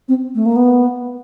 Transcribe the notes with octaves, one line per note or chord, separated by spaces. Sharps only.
C4
A3
A#3
B3